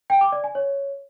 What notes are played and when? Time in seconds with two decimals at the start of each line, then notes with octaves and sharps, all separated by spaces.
0.10 G5
0.21 D6
0.32 D5
0.44 G#5
0.55 C#5